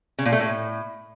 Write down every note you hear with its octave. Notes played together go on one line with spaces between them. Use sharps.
C#3
A#2
A3
A2